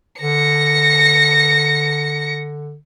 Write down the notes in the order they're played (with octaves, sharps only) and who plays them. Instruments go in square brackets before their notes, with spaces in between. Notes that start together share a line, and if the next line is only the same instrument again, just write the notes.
[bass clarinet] D3 [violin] A#6 C#7